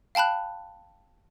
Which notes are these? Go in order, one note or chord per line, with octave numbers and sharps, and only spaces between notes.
F5 G5 A5 B5 F#6